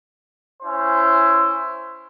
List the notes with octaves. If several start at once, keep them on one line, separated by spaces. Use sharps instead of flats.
C#4 E4 C5